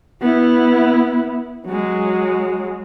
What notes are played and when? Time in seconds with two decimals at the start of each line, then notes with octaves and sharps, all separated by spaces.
0.21 B3 E4
1.65 F#3 G#3